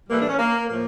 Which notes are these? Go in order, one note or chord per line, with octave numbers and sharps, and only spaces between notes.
A2 E3 G3 A#3
D4
C#4
A#3
A2 F3 A#3